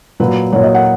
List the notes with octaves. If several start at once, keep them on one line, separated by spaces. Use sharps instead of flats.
A#2 F#3 B4
A#2 F#3 C#5
D#5
F#5